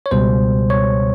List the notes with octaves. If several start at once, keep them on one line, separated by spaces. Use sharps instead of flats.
C#5
C#2 B2 G3 C5
C#5